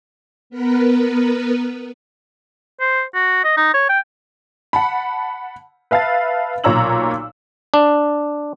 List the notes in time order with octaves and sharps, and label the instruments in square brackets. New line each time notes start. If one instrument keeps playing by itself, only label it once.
[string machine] B3 A#4 B4
[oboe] C5
F#4
D#5
D#4
C#5
G5
[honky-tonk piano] F#5 A5 B5
B4 E5 F5 A5 A6
B1 A#2 C#5 A#5 E6 F#7
[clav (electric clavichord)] D4